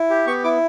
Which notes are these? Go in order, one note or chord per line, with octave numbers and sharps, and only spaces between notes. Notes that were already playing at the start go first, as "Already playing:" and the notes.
Already playing: E4
G4
B3 C#6
E4 D6